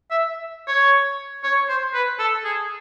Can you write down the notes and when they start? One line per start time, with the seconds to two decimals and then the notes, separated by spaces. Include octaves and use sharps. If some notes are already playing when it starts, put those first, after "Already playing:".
0.11 E5
0.67 C#5
1.43 C#5
1.69 C5
1.94 B4
2.19 A4
2.44 G#4